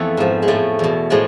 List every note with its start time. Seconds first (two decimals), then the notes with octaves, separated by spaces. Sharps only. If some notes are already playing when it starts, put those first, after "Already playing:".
Already playing: F2 E3 A3 B3
0.17 G#2 F3
0.42 G#3
0.48 A2 F3 A3
0.79 E2 B2
1.10 A2 F3 G#3